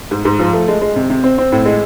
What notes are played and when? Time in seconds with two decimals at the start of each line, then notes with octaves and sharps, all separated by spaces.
0.11 G#2
0.25 G#2
0.39 F3
0.53 A3
0.68 G#3
0.82 G#3
0.96 C3
1.10 C3
1.24 C4
1.38 C4
1.52 A2
1.65 G#3